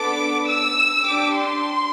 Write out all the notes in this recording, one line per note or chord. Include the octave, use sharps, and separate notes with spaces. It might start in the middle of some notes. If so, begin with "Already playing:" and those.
Already playing: B3 D4 A4 D6
E6
D4 G4 D6
C6